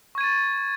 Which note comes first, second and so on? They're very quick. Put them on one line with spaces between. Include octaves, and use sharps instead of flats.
C#6 G#6 D#7 A6